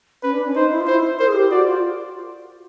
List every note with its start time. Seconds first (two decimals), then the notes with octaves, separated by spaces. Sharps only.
0.23 C#4 B4
0.33 D4
0.44 C#4
0.55 D#4 C5
0.71 E4
0.80 F4
0.87 E4 C5
1.19 A#4 C5
1.28 G#4
1.34 G4
1.50 F#4 D5
1.67 F4